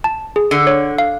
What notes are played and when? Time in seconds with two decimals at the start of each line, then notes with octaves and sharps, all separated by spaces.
0.04 A5
0.36 G#4
0.51 D3
0.67 C#5
0.98 F5